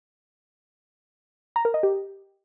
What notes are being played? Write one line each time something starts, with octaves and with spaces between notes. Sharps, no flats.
A#5
A#4
D#5
G4